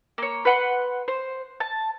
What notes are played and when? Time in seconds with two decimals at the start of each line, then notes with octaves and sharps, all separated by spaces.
0.18 A#3 C#5
0.45 B4 F#5 C6
1.08 C5
1.60 A5